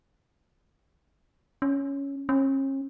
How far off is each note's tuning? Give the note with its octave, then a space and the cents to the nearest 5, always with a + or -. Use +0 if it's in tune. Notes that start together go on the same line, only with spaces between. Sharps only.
C#4 +5
C#4 -40